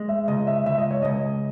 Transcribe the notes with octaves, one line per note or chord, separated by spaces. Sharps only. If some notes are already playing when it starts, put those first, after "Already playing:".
Already playing: G#3
E5
C#2 D#5
E5
C#2 E5
D#5
C#5
C#2 D#5